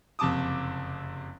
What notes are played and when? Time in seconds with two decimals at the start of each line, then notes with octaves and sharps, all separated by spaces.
0.19 F#1 F2 C3 A5 D6 D#6